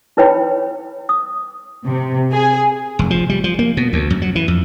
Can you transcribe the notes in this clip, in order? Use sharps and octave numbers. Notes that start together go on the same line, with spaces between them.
D#4 E4 B4 C#5 G5 B5
D#6
C3
G#4
F1
F3
G3
F3
A#3
B2
D2
F#2
F#3
E3
F2